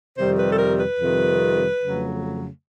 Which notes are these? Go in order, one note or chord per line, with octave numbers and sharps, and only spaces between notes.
F2 C3 D#3 G3 C5
B4
A4
A#4
B4
F2 C3 D#3 G3
F2 C#3 F#3 A3